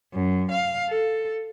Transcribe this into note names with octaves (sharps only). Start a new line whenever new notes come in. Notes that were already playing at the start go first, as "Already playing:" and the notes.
F#2
F5
A4